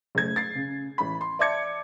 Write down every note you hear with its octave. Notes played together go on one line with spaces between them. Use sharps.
F#1 A3 G#6
A6 C7
C#3
A1 B5
C6
D5 E5 A5 D6 G#6 C#7